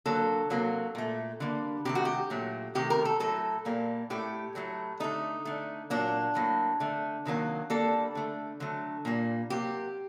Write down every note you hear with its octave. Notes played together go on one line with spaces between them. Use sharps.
D3 F#3 A#3 A4
C3 F#3 A#3
A#2 A3
D3 G3 A#3
C3 D#3 A3 G4
F#4
G4
A#2 F#3 A3
C3 D#3 A3 G4
A#4
A4
A2 F#3 A3 A4
A#2 G3 A#3
A2 A3 G4
A2 F#3 A3
D3 A3 D#4
D3 A3
A#2 F#3 A#3 D4
A2 F#3 A#3
D3 A3
C3 D#3 F#3 A#3
D3 G3 A#3 A4
D3 A3
D3 F#3 A3
A#2 G3 A#3
C3 F#3 A#3 G4